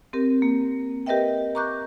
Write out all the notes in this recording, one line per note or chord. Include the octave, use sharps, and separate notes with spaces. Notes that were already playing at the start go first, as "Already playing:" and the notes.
C4 G4 A#4
A#3
G4 A#4 B4 D#5 E5 G5
A#5 C#6 D6 F#6 G6